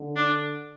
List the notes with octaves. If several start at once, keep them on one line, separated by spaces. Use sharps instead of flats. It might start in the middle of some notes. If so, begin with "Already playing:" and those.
Already playing: D3
D4